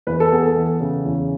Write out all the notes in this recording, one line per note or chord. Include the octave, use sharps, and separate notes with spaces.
E2 B4
A4
B3 G#4
A4
E3
C#3
E2